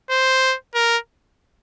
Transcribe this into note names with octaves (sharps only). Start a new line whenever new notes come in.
C5
A#4